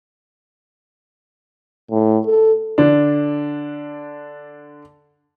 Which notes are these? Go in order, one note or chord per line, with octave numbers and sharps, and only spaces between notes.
A2
A4
D3 D4